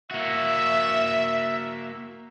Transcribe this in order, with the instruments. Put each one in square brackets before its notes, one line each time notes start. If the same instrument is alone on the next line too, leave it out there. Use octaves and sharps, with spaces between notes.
[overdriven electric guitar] A#3 F#4 [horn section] E5